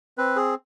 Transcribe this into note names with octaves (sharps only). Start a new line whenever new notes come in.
C4 B4
G#4